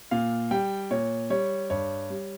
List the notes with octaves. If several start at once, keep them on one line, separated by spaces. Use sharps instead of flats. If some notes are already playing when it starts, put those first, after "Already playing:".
A#2 F5
G3 G5
A#2 C#5
G3 C#5
G2 C#5
G3